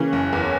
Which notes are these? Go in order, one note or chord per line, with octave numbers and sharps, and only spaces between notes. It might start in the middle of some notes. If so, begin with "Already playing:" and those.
Already playing: C#3 E3 A#3 C#4
F#1
E2